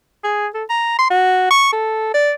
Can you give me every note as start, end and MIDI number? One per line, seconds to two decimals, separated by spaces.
0.24 0.47 68
0.54 0.64 69
0.69 0.96 82
0.99 1.07 84
1.10 1.47 66
1.51 1.69 85
1.73 2.11 69
2.14 2.33 74